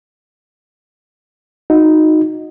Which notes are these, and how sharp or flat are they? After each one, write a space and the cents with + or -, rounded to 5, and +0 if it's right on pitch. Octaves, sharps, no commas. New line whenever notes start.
D#4 +0 F#4 -20